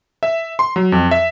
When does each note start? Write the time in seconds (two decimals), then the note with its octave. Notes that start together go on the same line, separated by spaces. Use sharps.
0.23 E5
0.59 C6
0.76 F#3
0.92 F2
1.11 E5